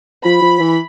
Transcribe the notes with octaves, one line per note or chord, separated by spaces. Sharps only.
F3 B5
F3
E3